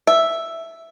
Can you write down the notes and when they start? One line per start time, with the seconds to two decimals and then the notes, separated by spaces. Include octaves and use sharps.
0.07 E5